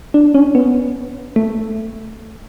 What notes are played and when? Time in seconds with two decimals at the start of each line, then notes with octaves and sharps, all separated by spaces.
0.14 D4
0.34 C#4
0.55 B3
1.36 A3